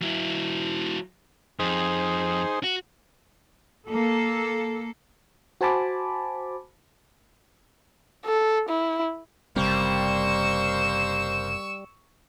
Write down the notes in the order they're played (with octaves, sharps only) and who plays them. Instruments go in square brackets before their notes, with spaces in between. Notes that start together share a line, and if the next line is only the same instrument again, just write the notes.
[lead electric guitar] F#3 E4
[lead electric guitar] F2 [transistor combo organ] D#4 G#4 C5
[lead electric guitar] F#4
[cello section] A#3 A4
[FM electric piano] F#4 C5 G#5 A5 B5 D6
[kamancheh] A4
E4
[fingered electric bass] F#1 C3 C4 [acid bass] G3 [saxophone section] A#3 C5 [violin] C#6 E6